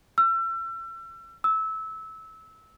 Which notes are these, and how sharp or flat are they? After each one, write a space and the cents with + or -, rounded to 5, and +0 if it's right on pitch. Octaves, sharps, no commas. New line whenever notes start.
E6 +35
E6 -20